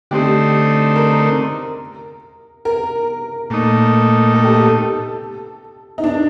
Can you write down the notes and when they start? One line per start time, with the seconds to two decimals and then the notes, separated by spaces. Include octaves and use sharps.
0.11 D3 A3 C4 D#4 G4
0.96 A#4
2.65 A#4
3.50 A#2 A3 D#4
4.34 A4
4.44 G4
4.54 A4
5.98 D#4
6.04 D4